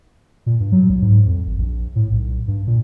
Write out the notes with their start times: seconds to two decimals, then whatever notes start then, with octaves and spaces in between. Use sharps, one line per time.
0.46 A#2
0.60 G2
0.72 F#3
0.89 C2
1.02 G#2
1.26 F2
1.46 G#1
1.58 A#1
1.96 A2
2.12 B1
2.48 G2
2.67 A#2